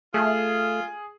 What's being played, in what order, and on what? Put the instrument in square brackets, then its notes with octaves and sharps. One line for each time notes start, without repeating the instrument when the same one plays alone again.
[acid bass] A3 [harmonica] F4 [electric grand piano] G#4